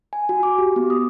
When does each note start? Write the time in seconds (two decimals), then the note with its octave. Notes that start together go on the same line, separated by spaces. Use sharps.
0.13 G#5
0.29 F#4
0.43 D6
0.58 G4
0.76 B3
0.90 D#6